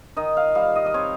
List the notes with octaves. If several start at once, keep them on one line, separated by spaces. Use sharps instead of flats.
D#3 D#5
F5
G3 F5
D#5
D#5
C4 C#5